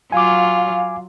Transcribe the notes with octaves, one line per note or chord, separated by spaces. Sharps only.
F#3 F4 F5 G#5 D6